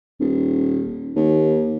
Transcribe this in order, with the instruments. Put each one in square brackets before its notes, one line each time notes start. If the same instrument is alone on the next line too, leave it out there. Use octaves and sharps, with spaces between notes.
[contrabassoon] D#1
D#2